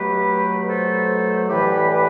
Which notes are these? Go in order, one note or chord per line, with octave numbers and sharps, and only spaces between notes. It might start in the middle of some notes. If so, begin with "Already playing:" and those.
Already playing: B2 F#3 A3 G4 B4
A4 C5
A2 E3 G3 G4 B4
G4 B4